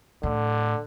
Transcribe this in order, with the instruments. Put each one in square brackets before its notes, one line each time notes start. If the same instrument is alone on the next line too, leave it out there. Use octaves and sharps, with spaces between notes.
[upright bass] A2 [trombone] D3